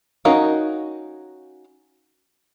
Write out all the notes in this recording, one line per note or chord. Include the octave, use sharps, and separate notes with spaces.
C#4 D#4 F#4 A#4 F5